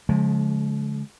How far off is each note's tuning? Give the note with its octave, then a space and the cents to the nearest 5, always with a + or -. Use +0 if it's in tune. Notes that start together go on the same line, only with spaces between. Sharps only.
D3 -35 F3 +40 G#3 +30